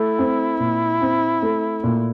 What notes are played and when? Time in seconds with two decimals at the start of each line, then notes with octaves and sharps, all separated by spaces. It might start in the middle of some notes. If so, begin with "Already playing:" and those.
Already playing: A3 E4
0.19 C4
0.60 A#2
1.02 C4
1.43 A3
1.84 A#2